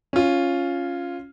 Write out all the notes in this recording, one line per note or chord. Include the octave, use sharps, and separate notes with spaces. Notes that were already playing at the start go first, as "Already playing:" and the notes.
C#4 F4